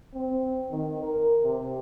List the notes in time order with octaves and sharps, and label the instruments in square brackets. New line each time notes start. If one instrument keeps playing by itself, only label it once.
[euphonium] C4
D#3
A#4
C3